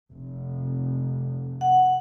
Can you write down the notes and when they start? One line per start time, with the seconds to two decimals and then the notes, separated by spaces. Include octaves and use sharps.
0.12 F1
1.61 F#5